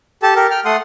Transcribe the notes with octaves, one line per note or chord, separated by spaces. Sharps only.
G4 A4 A5
G4 A4 A#4
G5 F6
A3 A4 F#5 C6 D#6